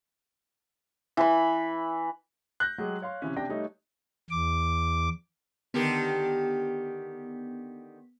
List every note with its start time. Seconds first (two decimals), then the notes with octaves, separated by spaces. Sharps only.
1.17 E3 B5
2.60 F#6 G6 A#6
2.78 F#3 G#3 G4 G#4
3.02 C#5 F5 C6
3.22 C3 E3 C#4
3.36 C3 D4 G5 A#6
3.49 G3 A3 D#4 C#5
4.30 E2 D6
5.74 D3 D#3 B3 G4